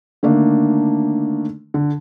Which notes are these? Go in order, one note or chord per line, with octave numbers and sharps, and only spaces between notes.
D3 D#3 A3 A#3 D4
D3